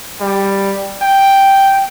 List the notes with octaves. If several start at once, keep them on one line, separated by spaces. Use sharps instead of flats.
G3
G5